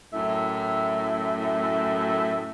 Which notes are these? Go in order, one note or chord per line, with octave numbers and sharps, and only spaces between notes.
F#2 A2 E4 E5